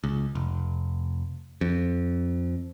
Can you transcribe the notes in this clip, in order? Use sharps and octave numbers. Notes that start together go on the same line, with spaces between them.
C#2
F1
F2